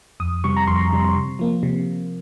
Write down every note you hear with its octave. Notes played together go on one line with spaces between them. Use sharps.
F2 D#6
C3 G3 C#6
A#5
F2 C6
C3 G3
C3
F3 A#3
C3